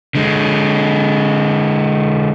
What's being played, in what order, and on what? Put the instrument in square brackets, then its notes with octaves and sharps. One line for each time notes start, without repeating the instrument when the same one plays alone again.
[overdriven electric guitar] D3 G#3